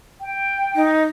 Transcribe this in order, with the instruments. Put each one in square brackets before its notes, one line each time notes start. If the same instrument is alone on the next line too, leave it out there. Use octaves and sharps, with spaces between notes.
[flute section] G5
[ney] D#4